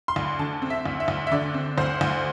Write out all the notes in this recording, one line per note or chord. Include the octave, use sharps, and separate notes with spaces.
C6
D2
D3 A5
C4
E5
D2
E5
D2
E5
D3 D5
C4
D2 C5
D2